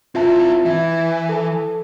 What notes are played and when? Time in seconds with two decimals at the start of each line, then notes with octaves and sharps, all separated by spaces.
0.15 C4 E4 F4 E5 A5
0.66 E3 E5
1.29 A4 A5